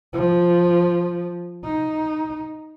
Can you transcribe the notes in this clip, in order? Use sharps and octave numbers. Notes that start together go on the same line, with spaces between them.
F3
D#4